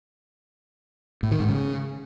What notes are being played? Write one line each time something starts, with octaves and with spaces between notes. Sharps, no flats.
A2
D#3
G#2
C#3